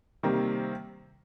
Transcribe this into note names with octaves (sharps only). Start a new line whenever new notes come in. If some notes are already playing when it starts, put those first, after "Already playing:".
C3 D#3 G3 A#3